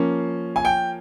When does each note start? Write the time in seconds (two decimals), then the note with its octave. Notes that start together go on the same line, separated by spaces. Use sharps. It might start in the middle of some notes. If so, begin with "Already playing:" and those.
Already playing: F3 A#3 C#4
0.56 G#5
0.65 G5